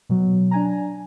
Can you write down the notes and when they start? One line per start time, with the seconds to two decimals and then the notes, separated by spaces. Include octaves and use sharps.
0.09 B2 F#3
0.51 D4 G#5 A#5